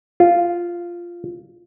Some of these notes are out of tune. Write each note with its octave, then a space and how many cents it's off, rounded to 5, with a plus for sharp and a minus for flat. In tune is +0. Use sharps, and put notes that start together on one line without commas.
F4 -5